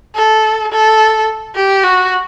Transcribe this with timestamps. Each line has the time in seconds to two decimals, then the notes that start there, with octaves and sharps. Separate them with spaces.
0.15 A4
0.72 A4
1.55 G4
1.84 F#4